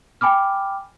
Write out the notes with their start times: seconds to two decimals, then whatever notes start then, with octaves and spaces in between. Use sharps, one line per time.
0.21 G5 G#5 B5 D6 F6